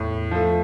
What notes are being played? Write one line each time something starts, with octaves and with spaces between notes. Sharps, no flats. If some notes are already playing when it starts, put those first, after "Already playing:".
Already playing: E2 A2
F3 A3